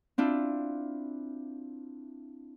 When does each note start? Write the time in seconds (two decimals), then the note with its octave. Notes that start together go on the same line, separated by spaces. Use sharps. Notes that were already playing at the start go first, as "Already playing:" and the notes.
0.18 C4 D4 E4 F4